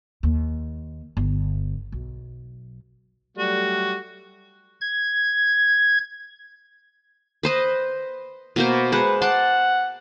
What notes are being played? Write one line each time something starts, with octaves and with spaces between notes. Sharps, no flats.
D#2
G1
B1
F#3 G3 A3 F#4
G#6
B4 C5 D#5
B2 A#3 C5
G#3 B4 C5 F#5
F#5 A5 C6 D6